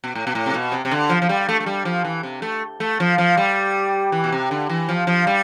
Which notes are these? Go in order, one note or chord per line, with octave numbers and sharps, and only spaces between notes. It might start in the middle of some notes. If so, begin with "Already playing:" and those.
B2
A2
B2
A2
C3
B2
C3
C3
D3
F3
F3
G3
A3
A3
G3
F3
E3
C3
A3
A3
F3
F3
G3
E3
B2
C3
D3
E3
F3
F3
G3